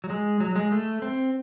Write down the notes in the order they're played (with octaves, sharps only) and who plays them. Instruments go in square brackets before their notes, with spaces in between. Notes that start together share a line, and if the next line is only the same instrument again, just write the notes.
[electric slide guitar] F#3
G#3
F#3
G#3
A3
C4